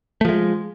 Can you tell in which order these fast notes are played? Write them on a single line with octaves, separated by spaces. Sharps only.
A3 F3 G#3